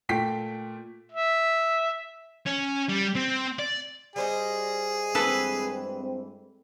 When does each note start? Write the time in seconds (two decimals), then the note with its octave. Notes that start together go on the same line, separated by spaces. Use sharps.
0.09 A#2 A3 G5 B6
1.12 E5
2.46 C#4
2.89 G3
3.15 C4
3.59 D5
4.16 G3 G#4 C5 D#5
5.15 G2 E3 G#3 C4 A4 B4